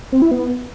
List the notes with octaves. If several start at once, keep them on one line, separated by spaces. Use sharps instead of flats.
C4
E4
B3